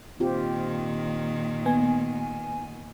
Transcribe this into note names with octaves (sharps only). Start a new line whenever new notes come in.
A#2 D#3 C4 F4 G4
B3 G#5